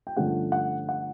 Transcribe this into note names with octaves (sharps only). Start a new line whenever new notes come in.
G5
G2 D3 F3 A3 C#4 F#5
F#5
F#5